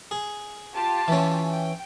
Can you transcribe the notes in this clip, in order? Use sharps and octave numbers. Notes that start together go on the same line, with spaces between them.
G#4
F4 G4 A5
E3 C#4
G5